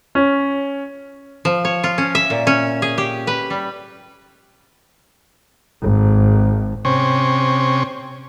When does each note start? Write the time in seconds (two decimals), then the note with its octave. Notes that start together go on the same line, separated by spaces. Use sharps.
0.15 C#4
1.45 F3
1.65 C#5
1.84 F4
1.98 C#4
2.15 E5
2.30 A#2
2.47 C#4
2.82 G#4
2.98 G4
3.27 B4
3.50 G3
5.82 G#1
6.85 C3 C#4